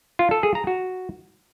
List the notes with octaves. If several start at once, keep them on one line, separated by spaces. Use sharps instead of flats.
F4
A4
G#4
A#5
F#4